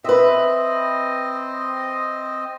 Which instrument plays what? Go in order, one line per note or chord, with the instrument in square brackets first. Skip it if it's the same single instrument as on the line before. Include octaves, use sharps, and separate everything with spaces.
[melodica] C4 D#5 [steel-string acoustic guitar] B4 E5